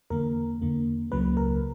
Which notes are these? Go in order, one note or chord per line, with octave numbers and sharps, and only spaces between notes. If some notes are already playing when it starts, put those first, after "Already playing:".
E2 D3 A#3 A#4
E2 D3 A#3
C#2 C#3 F#3 A#3 B4
A#4